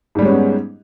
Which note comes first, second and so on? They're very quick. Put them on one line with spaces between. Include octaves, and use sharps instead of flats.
G#2 G3 G#3 C#4 B3